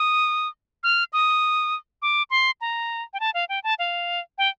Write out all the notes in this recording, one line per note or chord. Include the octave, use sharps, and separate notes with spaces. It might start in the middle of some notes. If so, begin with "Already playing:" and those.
Already playing: D#6
F6
D#6
D6
C6
A#5
G5
A5
F5
G5
A5
F5
G5